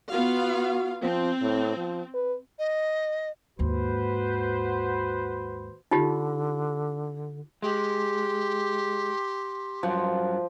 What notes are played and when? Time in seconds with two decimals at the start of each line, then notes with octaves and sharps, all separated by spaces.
0.10 B3 F4 F#4 F5
1.03 F3 C4
1.42 A2
1.77 F3
2.14 B4
2.59 D#5
3.59 D#2 G#2 F#4 B4 C5
5.91 D3 D#4 F4 G4
7.62 G#3 G4 C6
9.83 G2 F3 F#3